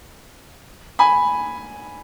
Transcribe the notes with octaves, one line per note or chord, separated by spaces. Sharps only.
G#5 B5